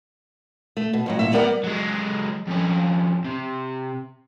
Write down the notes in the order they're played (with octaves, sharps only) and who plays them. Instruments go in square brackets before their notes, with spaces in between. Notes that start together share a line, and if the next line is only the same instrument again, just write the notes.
[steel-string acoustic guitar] A3
B2
F2 A2 F#3
A#2 E5
G3 B3 G4 A#4 D5 F#5
[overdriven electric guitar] F#3 G#3
F2 C#4
C3